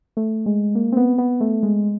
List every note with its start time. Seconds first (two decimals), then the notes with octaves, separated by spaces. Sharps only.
0.17 A3
0.46 G#3
0.75 A#3
0.92 C4
0.97 B3
1.18 B3
1.41 A3
1.63 G#3